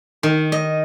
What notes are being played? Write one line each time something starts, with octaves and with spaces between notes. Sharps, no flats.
D#3
D#5